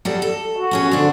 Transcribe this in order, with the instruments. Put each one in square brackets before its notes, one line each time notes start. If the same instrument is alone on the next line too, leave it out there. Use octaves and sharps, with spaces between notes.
[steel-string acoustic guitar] F#3 G3 A4
A4
[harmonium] F#4
[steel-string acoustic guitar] B3 C#4 G#4
[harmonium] D3 [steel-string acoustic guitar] C4 D4